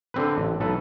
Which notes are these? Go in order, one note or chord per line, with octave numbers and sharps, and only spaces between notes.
D3 C4 B4
A1
B1 A4 B4